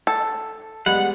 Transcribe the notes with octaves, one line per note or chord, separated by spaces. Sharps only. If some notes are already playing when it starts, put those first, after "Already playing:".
A4
G3 G#3 B3 F#5